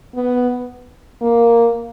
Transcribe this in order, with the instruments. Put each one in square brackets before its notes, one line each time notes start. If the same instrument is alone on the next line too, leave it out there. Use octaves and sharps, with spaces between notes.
[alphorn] B3
A#3